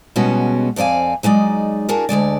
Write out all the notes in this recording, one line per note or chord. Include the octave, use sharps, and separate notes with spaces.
B2 G3 G#3 B3 C#4 F#4
F2 C4 D5 F5 G#5
F#3 G#3 D#4 D5
D4 F#4 G#4 A#4
D2 D3 G#3 D5